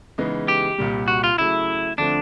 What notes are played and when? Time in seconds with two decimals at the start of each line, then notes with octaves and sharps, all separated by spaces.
0.18 C#3 E3 G#3 B3 D#4
0.48 G4
0.78 C2 A#2 G3
1.08 F#4
1.24 F4
1.38 C#3 F#3 A3 E4
1.98 D3 F3 A3 C4 D4